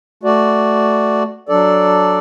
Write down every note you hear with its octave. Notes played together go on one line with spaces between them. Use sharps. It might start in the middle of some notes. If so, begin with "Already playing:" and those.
A3 F#4 D5
F#3 D4 A4 D5